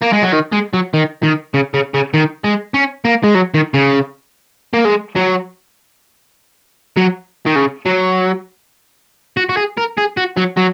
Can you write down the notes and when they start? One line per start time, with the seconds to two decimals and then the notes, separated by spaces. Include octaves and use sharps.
0.02 A#3
0.13 G#3
0.23 F#3
0.33 D#3
0.53 G#3
0.74 F#3
0.94 D#3
1.23 D#3
1.54 C#3
1.74 C#3
1.94 C#3
2.14 D#3
2.44 G#3
2.74 C#4
3.05 A#3
3.24 G#3
3.35 F#3
3.54 D#3
3.74 C#3
4.74 A#3
4.85 G#3
5.16 F#3
6.97 F#3
7.46 D#3
7.56 C#3
7.86 F#3
9.37 F#4
9.49 F#4
9.57 G#4
9.77 A#4
9.97 G#4
10.17 F#4
10.37 F#3
10.57 F#3